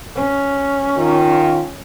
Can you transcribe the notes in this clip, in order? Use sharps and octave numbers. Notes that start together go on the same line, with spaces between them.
C#4
D#3 F4